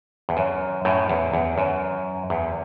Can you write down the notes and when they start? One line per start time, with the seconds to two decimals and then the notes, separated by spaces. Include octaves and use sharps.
0.29 E2
0.37 F#2
0.85 F#2 A2
1.09 E2
1.34 E2
1.58 F#2
2.30 E2